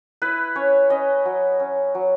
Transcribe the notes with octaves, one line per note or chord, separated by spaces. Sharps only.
E4 B4
C#4 C#5
C#4 D#5
F#3
C#4
F#3